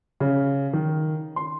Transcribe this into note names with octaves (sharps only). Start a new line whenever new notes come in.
C#3
D#3
C6